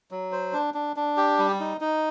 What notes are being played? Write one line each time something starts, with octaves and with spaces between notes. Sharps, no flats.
F#3
C5
D4
D4
D4
G4
G3
D#4
D#4